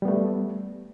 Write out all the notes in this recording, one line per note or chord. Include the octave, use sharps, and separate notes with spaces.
G3 A3 B3